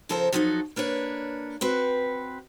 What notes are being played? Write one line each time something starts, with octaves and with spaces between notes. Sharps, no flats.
C#3 F3 A4 A#4 C5
F3 F#3 D#4 F#4 A4
A#3 D4 B4 C#5
C4 F#4 B4